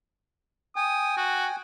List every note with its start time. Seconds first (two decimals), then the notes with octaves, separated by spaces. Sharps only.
0.76 G5 G#5 D#6
1.17 F#4